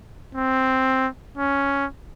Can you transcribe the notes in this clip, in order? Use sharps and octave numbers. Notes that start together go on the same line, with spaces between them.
C4
C#4